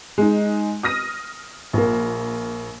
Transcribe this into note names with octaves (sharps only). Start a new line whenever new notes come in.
G#3 D#4
D#6 F6 A#6 D#7
A#1 A#3